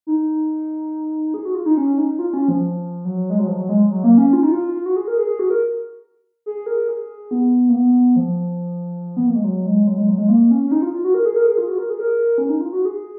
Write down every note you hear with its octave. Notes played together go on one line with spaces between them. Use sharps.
D#4
G#4
F#4
F4
D#4
C#4
D#4
F4
C#4
F3
F#3
G#3
F#3
F3
F#3
G#3
F#3
A#3
C#4
F4
D#4
F4
F4
F#4
G#4
A#4
G#4
G#4
F#4
A#4
G#4
A#4
G#4
B3
A#3
B3
F3
B3
A#3
G#3
F#3
G#3
F#3
G#3
F#3
G#3
A#3
C#4
C#4
D#4
F4
F4
F#4
A#4
G#4
A#4
G#4
F4
F#4
A#4
G#4
A#4
C#4
D#4
F4
F#4
G#4